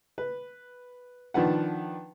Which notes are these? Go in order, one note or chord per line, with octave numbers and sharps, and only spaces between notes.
B4
D#3 F3 D4 B4 F#5